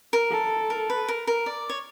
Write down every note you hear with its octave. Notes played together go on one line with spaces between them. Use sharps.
A#4
A4
A#4
B4
A#4
A#4
D5
C#5